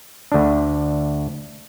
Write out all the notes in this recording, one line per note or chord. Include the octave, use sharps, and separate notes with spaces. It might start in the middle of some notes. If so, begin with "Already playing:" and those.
D2 D4